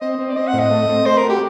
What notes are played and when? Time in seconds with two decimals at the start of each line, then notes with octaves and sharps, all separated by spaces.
0.01 C4 D#5
0.19 C4
0.29 D5
0.36 C4 D#5
0.48 F#5
0.53 A2
0.59 D#5
0.71 A3
0.89 C4
1.06 A3 C5
1.17 A#4
1.24 F#4
1.29 G4